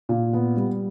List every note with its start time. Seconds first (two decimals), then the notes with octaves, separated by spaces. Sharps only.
0.09 A#2
0.33 B3
0.57 G3